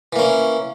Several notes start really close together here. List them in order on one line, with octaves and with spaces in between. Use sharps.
E3 A#3 C#4